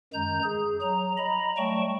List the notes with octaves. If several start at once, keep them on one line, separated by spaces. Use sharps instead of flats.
F#2 D#3 G#3 A#5 G6
G#4
F#3 A#5
D#5 A#5 B5
F#3 G3 A3 G5 A5 C#6